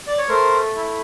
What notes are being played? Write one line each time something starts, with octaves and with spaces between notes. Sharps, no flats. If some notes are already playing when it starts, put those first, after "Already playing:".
D5
C#5
A3 A#4 C5
E4